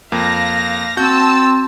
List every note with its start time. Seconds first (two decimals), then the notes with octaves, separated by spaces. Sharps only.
0.12 F2 A#3 F5 A#6
0.97 C4 F#4 A5 E6 G6